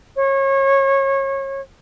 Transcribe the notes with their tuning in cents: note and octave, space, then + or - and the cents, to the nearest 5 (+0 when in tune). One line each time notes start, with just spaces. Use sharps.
C#5 -30